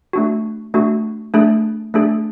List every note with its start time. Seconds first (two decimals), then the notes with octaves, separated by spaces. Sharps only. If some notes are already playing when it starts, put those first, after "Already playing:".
0.13 A3 D4 F#4
0.74 A3 D4 F#4
1.34 A3 D4 G#4
1.94 A3 D4 G#4